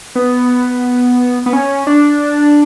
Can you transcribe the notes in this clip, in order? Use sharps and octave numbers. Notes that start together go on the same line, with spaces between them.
B3
B3
C#4
D4